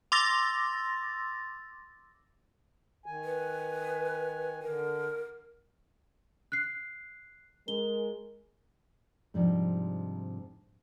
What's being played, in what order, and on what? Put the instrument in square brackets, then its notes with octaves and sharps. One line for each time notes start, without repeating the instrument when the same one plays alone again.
[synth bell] C6 D6 E6 A6 A#6
[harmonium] D#3 G#5
[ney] B4
[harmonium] D3 [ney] A#4
[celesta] F#6 C7
[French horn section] G#3 A#4 [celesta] G7
[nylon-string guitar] G#2 C3 F3 G3 D4 D#4